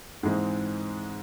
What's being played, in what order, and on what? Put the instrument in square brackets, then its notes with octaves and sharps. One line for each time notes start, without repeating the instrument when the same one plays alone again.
[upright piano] G#2 E3 G#3 C4